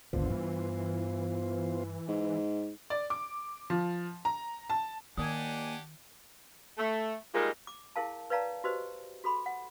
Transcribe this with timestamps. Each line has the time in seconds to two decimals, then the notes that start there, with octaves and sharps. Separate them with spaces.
0.13 G#1 D#2 D3 B3 F4 C5
0.30 G2 E3
2.08 G#2
2.90 D5
3.10 D6
3.70 F3
4.25 A#5
4.70 A5
5.18 D#2 D#3 A#3 D4 G4 D5 F#5 G#5
6.77 A3
7.33 G3 G#3 A#3 D#4 F4 A#4
7.67 D6
7.96 E4 G#4 A#4 F5 A5
8.30 B4 C#5 D5 F5 A5 A#5
8.64 F#4 G4 B4 C5 D#5
9.24 F#4 A4 B5 C6
9.46 F#5